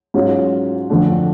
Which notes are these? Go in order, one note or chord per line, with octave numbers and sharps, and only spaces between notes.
G#2 F#3 C#4 F4
F2 D3 F3 A3 D4